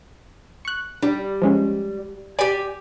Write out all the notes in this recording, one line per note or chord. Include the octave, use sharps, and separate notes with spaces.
C#6 F#6
G3 D4
F3 G#3 C#4
G4 D5 G#5